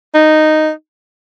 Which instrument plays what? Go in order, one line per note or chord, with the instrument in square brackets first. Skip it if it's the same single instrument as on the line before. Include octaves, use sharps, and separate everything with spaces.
[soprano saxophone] D#4